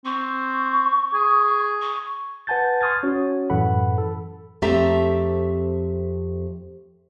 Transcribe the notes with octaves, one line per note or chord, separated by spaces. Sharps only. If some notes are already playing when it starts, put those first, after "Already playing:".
C4 C#6
G#4
C#6
B4 F#5 G#5 A5 G6 A6
C6 C#6 D#6 F6 G#6 A6
C#4 F#4 C#5
F#2 A2 E3 A4 F#5 B5
A4
F2 A3 C4 G4 E5 A#5